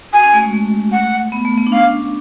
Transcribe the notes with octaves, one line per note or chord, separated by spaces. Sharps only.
F#4 G#5
C#4
A3
G#3
A3
F#5
B3
A3
B3
D4
C#4 F5